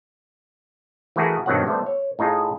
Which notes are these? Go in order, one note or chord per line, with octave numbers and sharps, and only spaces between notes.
E3 A3 E4 F#4 G#4 A#4
G2 B2 D#3 F#3 C4 F#5
G3 A3 B3 C5
C#5
A2 D#4 F4 G#4 D#5